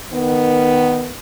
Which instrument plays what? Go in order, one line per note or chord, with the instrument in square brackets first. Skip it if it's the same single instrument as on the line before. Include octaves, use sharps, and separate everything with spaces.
[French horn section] D#3 B3